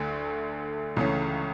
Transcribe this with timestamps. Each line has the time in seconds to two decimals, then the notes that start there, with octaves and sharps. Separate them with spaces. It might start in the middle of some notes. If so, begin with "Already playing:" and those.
Already playing: D2 D3 A3
0.96 C#2 C#3 E3 A3 C#4